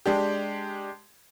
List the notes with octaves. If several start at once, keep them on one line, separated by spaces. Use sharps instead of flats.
G#3 D4 G4